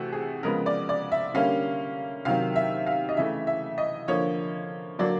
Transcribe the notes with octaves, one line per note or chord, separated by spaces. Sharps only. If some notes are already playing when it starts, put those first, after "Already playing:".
Already playing: C3 E3 A3 F#4
G#4
C#3 F3 G#3 B3 A#4
D5
D5
E5
D3 G3 A#3 C#4 F5
C3 D#3 F#3 F5
E5
F5
D#5
C#3 E3 A3 E5
E5
D#5
D3 F3 A#3 C#5
D3 F#3 A#3 D4 D5